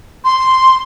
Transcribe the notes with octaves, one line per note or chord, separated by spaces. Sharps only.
C6